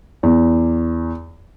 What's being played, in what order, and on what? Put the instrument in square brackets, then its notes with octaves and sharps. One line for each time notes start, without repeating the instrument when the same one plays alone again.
[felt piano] E2